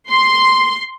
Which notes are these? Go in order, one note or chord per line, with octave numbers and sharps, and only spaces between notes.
C6